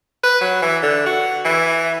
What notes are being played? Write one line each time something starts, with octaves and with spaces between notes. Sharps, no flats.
B4
F#3
E3
D3
F#4
E3